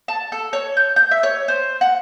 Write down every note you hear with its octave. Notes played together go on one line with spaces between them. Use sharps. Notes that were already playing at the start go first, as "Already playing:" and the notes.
A5
A4
C#5
G6
G6
E5
C#5
C5
F#5